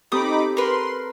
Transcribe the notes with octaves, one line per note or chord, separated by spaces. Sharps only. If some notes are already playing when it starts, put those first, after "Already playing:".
C4 D#4 G4 A4 B5 D6 D#6
A#4 B4 C6